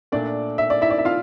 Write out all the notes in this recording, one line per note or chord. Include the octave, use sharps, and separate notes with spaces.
A#2 A3 D4 D5
E5
D5
E4 E5
D5
E5
F4 F5